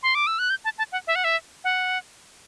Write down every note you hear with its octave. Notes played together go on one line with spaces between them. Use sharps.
C6
D6
E6
F#6
G6
A5
A5
F#5
E5
F#5
E5
F#5